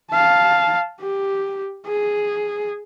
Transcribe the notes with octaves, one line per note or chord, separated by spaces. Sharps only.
F5 A5
G4
G#4